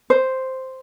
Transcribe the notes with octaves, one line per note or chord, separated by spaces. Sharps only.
C5